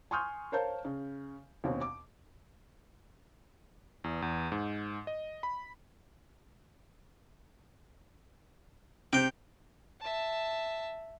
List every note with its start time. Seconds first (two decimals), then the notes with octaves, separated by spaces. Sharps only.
0.11 G#5 C6 C#6 D#6 F6 G6
0.52 A#4 C5 C#5 F5 A5 G6
0.85 C#3
1.64 D#2 B2 C4 C#4
1.81 D6
4.04 E2
4.22 E2
4.52 G#2
5.07 D#5
5.43 B5
9.13 C3 C4 G5
10.01 E5 A5